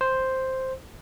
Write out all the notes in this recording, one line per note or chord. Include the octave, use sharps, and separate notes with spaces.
C5